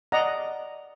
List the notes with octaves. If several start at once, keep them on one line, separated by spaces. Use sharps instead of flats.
D5 D#5 F#5 A#5